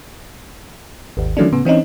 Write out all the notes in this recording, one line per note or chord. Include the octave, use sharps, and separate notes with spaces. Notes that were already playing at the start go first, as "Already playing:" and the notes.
G#1 D#2
D#3 E3 F#3 A3 C#4 D4
A2 C#3 B3
E3 C4 C#4 D#4